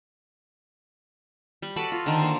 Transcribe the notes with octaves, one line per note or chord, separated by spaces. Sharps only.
G3
F#4 A4 B4 D5
F4
D3 D#3 D4 C5
A#3 D4